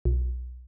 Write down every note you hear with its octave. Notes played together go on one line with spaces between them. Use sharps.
B1